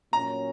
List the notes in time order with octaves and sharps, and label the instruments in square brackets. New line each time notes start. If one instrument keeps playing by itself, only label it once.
[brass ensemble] A#2 F#3 C#4 [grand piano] A#5